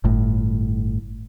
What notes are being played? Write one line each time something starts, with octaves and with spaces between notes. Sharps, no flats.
G1 A2